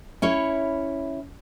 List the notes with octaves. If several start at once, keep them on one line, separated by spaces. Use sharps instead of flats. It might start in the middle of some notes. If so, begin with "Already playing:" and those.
C#4 E4 C#5